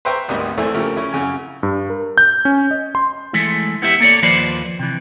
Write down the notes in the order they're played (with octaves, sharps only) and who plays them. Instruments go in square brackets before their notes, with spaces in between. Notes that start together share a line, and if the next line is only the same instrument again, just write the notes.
[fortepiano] B4 C5 E5 G5 A#5 C#6
G#1 D2 D#3 G3 B3 D#4
E2 E3 A3 C4 E5
C#3 F3 A3 A#3 E4 G4
C#3 C#4 E4
F#2 C#3 G#5
[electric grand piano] G2
A#4
G6
C#4
D#5
C6
[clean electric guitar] E3 G#3 A3 E4
B3 E4 G4 E5
A#3 A4 C#5 D5
D#2 F3 A#3 B4 C5 D5
C3 E3